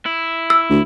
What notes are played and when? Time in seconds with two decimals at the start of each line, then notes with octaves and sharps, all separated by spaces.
0.06 E4
0.50 E6
0.70 D2